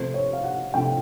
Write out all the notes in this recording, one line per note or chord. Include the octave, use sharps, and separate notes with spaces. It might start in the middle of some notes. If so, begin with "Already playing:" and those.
Already playing: C3 F3 A3 C5
C#5
F5
F#5
C3 F3 A3 G5